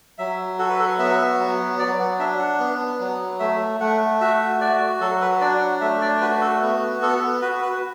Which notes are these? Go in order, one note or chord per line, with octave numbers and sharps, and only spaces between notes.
F#3 E5
F#4 A4
B4
A4
B3 E5
F#3
F#3 D5
F#5
D4 E5
F#5
B3
F#3
A3 E5
A3 F#5
F#4 E5
F#4 D5
F#3 A4
B4
D4 D5
F#5
A3 E5
D5
F#4 B4
A4
B3
B3 A4
F#4 B4
B4